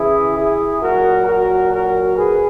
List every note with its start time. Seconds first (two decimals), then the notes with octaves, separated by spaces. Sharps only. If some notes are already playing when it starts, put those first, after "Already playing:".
Already playing: C#3 E3 E4 G#4
0.38 E4 G#4
0.82 A#2 F#3 F#4 A#4
1.28 F#4 A#4
1.73 F#4 A#4
2.17 G#4 B4